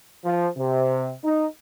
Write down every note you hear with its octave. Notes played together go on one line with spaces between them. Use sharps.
F3
C3
D#4